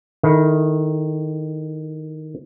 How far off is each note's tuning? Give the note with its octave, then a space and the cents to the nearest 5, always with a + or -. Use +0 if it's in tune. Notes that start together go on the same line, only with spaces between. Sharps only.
D#3 +0 E4 -20 A4 +0